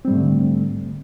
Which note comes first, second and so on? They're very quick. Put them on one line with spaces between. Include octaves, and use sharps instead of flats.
C4 G3 G#2 A3 D3